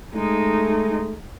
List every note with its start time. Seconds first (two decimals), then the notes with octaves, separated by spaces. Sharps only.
0.14 G#3 A3 D#4